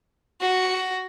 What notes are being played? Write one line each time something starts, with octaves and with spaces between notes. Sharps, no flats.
F#4